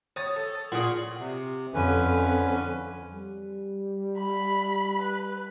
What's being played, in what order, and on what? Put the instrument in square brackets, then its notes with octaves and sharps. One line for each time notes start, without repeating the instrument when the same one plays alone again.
[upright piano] C#5 A6 [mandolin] D#6
[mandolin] A4
[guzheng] A#2 G#4 [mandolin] F#4 D5
[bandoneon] C3
[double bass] F2 [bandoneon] D3 C#4 B4
[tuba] G3
[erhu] B5
B4